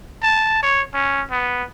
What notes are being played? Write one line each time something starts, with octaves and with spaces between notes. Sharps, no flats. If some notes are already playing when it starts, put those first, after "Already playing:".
A5
C#5
C#4
B3